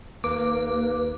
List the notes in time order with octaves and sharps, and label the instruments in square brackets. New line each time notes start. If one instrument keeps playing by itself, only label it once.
[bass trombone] D#2 [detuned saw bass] A#3 [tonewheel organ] B4 [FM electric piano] D6